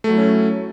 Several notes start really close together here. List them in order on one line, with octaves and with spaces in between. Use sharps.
A3 F#3 E4 C#4